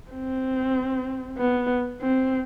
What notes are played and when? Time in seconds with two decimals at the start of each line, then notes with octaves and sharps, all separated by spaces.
0.11 C4
1.38 B3
2.01 C4